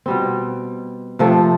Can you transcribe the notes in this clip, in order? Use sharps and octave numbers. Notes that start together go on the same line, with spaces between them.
B2 G3 C4
C3 F3 A3 C4